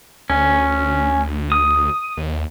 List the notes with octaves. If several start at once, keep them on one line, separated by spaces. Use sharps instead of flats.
D2 C#4
D#6
D#2